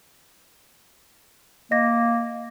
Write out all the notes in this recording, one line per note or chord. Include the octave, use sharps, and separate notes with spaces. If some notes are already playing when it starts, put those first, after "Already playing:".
A#3 D#5 A#6